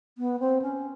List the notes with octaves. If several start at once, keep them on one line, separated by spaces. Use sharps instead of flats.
B3
C4
C#4